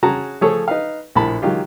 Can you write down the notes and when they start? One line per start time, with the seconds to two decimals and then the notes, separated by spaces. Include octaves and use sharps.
0.03 C#4 F#4 G#4 A5 A#5
0.41 F3 A3 G#4 A4 C#5
0.68 D#4 B4 F5
1.15 A#1 A2 A#4 A5 B5
1.42 D#3 F#3 G#3 F4 G4